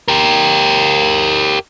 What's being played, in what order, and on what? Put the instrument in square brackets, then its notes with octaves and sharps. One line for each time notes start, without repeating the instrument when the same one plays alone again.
[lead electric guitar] G4 A#4